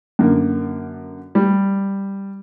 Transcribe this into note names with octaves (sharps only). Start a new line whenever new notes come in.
F#2 D3 A#3
G3